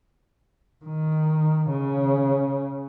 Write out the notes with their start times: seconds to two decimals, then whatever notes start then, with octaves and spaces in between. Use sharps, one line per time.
0.85 D#3
1.71 C#3